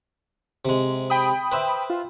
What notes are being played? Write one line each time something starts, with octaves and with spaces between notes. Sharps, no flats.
C3 G#3
G5 B5 D#6
B4 C5 E5
F4